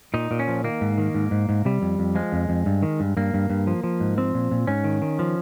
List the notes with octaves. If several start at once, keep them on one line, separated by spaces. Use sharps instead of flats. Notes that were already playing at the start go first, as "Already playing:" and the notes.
A#2 D#4
A#2
C#4
F3
D#3 A#3
G#2
D#3
G#2
G#2
G#2
C3 G3
F2
F2
F3 G#3
F2
F2
G2
D#3
G2
G2 A#3
G2
G2
F3
F3
G#2
F3 C4
A#2
A#2
G#2 C#4
D#3
D#3
F3